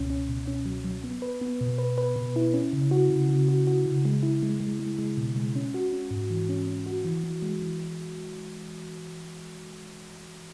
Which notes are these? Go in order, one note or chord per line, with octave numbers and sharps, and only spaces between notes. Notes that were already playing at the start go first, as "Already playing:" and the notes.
Already playing: C#2 B2 C#4
C#4
B2
C#4
F#3
F#3
B3
B4
B3
B2
B4
B4
B2
E4
C#4
C#3
F#4
C#3
C#3
F#4
F#4
C#3
G#3
E4
G#3
G#3
G#3
G#3
B2
G#3
C#4
F#4
C#4
G#2
E3
C#4
C#4
F#4
E3
E3
G#3
E3